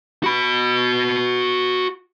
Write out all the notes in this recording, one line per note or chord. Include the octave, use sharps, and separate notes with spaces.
F#4 B5